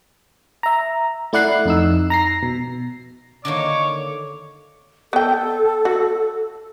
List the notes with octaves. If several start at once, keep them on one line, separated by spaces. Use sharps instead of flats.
E5 A#5
A3 E4 D5 F#5 F#6 C7
F2 D#4 E6
A#5 A#6 C7
B2
D3 D#3 A#3 C#5 D6
B3 A4 G5
F#4